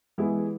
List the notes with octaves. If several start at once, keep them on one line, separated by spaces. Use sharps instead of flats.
E3 G#3 B3 E4 G#4